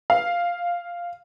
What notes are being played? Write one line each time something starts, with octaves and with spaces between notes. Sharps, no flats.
F5